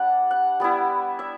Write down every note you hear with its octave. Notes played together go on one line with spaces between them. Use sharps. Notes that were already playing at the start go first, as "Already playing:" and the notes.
Already playing: G3 D4 F#5
F#5
G3 B3 E4
E5